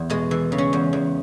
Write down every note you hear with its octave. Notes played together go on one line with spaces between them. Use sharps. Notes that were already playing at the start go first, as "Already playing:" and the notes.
Already playing: E2
B2 G#3
E3
C#3
C#4
E2
E2